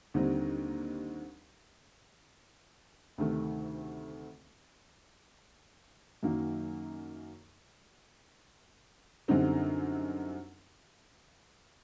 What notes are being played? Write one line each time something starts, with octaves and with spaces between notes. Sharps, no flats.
D#2 D3 G3 C4 D#4
D2 C3 D#3 A3
F#2 D#3 F#3 A#3 D#4
F#2 D3 G3 C4 D#4